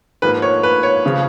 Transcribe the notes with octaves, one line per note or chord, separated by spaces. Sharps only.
G#2 F3 A#3 B4
C#5
B4
C#5
C#3 F3